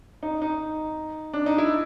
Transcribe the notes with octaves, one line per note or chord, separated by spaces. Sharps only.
D#4
D#4
D4
D#4
E4